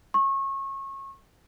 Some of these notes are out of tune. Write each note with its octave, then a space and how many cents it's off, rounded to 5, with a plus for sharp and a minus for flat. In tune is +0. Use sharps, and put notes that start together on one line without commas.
C#6 -30